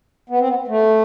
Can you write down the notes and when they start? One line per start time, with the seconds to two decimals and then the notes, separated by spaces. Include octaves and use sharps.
0.29 B3
0.39 C4
0.48 B3
0.68 A3